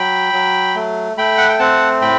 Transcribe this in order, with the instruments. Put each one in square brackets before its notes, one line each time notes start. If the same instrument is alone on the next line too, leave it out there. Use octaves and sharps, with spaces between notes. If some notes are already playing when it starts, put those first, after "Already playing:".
Already playing: [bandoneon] F#3 G5 B5
F#3
A3
A3 G5 B5
F#5
G5
C4 F#5 A5
A2 G5 B5